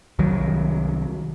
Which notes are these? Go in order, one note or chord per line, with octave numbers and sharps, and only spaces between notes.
C2 D#3 F#3